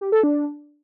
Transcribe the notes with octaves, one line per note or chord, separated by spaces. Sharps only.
G4
A4
D4